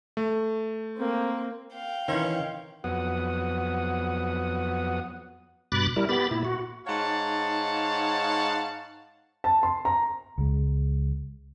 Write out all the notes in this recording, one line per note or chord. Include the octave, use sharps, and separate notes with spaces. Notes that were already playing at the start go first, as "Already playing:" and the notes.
A3
A#3 C4
F5 G5
D#3 E3 C4 C#4 D#4
F2 F#3 B3 F#5 D#6
G2 B2 B5 D6 F#6 A6
G3 E4 A#4
B3 G4 B5 A6
A#2 E4
F#4
G#2 D#4 C#5 F5 F#5 A5
A5
C6
A#5
C#2 G#3